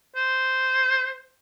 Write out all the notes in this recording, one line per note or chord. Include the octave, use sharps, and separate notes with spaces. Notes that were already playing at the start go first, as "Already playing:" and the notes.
C5